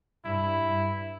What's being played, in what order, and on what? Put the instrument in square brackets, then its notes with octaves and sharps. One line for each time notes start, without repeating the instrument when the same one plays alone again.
[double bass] G2 [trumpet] E4
[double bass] G2